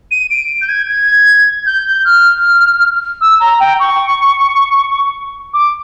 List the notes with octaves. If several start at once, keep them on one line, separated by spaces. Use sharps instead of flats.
D#7
D7
G6
G#6
G#6
G6
F6
E6
A#5
G5
C#6
D6